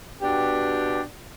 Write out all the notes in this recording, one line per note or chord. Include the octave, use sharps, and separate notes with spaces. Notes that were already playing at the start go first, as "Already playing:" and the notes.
B2 B3 D4 G4